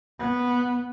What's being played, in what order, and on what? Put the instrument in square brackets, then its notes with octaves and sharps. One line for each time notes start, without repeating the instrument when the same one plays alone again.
[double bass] B3